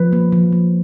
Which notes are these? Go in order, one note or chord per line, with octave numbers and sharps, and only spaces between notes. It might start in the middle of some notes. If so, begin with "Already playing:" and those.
Already playing: F3 B4
A#3
F3
A#3